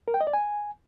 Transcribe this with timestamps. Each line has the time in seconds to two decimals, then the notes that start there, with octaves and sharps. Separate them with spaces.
0.08 A#4
0.14 G5
0.21 D#5
0.27 D5
0.33 G#5